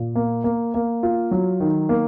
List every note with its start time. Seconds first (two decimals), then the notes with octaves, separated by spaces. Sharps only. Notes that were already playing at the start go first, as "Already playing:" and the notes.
Already playing: A#2
0.15 A#3
0.44 A#3
0.74 A#3
1.03 F4
1.31 F#3
1.60 D#3
1.89 A#3